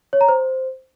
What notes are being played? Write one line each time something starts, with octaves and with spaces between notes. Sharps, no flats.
C#5
A#5
C5